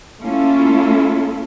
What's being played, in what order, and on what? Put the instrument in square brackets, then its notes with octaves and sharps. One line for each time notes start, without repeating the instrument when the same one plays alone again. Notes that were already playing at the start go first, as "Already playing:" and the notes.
[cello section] A3 A#3 C#4 E4 F4 A4